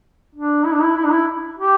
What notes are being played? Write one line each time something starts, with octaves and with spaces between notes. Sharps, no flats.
D4
E4
D4
E4
E4
D4
E4
G4